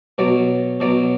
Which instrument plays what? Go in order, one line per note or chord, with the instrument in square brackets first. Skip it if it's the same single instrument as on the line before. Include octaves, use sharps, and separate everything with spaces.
[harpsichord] B2 F#3 D5
B2 F#3 D5